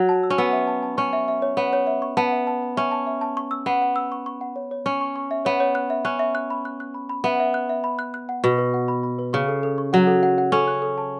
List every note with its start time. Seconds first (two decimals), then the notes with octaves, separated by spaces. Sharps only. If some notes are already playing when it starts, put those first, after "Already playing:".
Already playing: F#3
0.09 A5
0.23 E6
0.30 C#4
0.38 B3 E6
0.53 E5
0.67 A5
0.83 A5
0.97 C#4 C#6
1.13 E5
1.28 E5
1.42 C#5
1.57 B3 C#5
1.73 C#5
1.87 E5
2.02 C#6
2.17 B3 A5
2.32 E5
2.47 A5
2.62 A5
2.77 C#4 E5
2.91 A5
3.07 E5
3.21 A5
3.37 C#6
3.51 E6
3.66 B3 F#5
3.82 F#5
3.96 E6
4.12 C#6
4.26 C#6
4.41 F#5
4.56 C#5
4.71 C#5
4.86 C#4 C#6
5.01 C#6
5.16 C#6
5.31 E5
5.45 B3 C#5
5.60 C#5
5.75 F#6
5.90 E5
6.05 C#4 F#6
6.19 E5
6.35 F#6
6.50 B5
6.65 F#6
6.80 F#6
6.94 B5
7.09 B5
7.24 B3 E5
7.40 E5
7.54 F#6
7.69 E5
7.84 B5
7.99 F#6
8.14 F#6
8.29 F#5
8.44 B2 B4
8.58 B4
8.74 F#5
8.88 B5
9.03 B5
9.19 B4
9.33 C#3 C#6
9.48 A4
9.63 A4
9.78 C#6
9.93 F#3 F#5
10.07 A4
10.23 F#5
10.38 F#5
10.52 C#4 A4
10.68 F#6
10.82 A4
10.98 A5